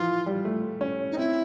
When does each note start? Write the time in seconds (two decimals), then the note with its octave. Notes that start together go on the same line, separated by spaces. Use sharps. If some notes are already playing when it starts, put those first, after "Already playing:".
Already playing: E3 F3 F4
0.26 G3
0.45 A3
0.81 C#4
1.11 D#4
1.17 C4 E4